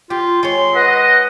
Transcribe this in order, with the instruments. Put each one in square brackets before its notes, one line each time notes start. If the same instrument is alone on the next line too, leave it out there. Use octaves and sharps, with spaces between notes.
[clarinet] F4 [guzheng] G4
[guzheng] G#3 C#5 [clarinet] C6
[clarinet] B4 [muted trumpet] D#5 [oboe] F#5